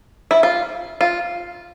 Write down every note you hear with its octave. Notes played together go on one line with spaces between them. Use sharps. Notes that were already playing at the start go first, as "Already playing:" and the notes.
E4
F4
F4